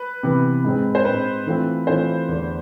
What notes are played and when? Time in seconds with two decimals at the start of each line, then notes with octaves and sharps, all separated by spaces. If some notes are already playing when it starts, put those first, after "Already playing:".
Already playing: B4
0.23 C3 E3 B3
0.64 G#2 G#3 C4
0.95 C5
1.05 G#2 G#3 C4 B4
1.47 E3 A3 C4 F4 A4
1.87 E3 A3 C4 F4 A4 C5
2.28 E2 D3 A3